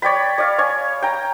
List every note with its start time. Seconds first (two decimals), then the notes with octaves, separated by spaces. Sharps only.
0.02 C#5 D5 G5 B5
0.38 D5 F5
0.58 C#5 G#5
1.02 G5 A#5